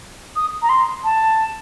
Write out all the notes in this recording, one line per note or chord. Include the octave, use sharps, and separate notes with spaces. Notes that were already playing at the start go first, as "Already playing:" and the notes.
D#6
A#5
C6
A5